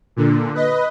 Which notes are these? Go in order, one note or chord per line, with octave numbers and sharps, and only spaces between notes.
A#2 D3
B4 D#5